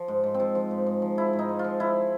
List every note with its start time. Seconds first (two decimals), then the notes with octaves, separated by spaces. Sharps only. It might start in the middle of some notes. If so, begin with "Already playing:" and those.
Already playing: F3
0.08 G#2
0.24 G#2
0.34 C4
0.40 F3
0.55 F3
0.71 G#2
0.87 G#2
1.02 F3
1.18 F3 E4
1.33 G#2
1.39 D#4
1.49 G#2
1.59 F4
1.64 F3
1.80 F3 E4